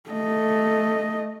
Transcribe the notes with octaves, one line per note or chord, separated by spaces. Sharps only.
A3 D#5